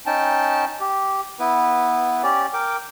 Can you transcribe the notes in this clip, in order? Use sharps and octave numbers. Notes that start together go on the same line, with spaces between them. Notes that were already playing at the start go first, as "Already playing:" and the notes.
C#4 D#4 G5 A5
G4
B3 E4 B4
C#4 G4 D5
A#4 G5 D6